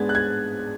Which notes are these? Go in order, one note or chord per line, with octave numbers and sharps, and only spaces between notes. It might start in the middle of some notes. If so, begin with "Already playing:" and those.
Already playing: G#2 G#3 B3 D4 G#6 A6
F#6
G#6